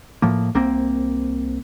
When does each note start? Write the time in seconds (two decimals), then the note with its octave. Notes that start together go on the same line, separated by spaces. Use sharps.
0.22 A2 F3 A#3
0.55 C2 A#3 C4